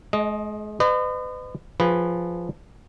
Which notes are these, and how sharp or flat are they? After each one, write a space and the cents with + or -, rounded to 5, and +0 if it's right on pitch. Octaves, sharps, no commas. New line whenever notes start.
G#3 +35 D#5 +0
B4 +40 D#5 -35
F3 +0 G#4 -25 B4 +0